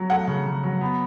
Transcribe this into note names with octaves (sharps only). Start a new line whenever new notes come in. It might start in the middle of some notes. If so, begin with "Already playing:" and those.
Already playing: F#3
A3 F#5
C#3
C#3
F#3
B3